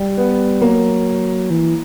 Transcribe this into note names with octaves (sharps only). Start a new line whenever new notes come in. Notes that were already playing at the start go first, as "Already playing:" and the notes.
Already playing: G3
B3
F#3 A#3
E3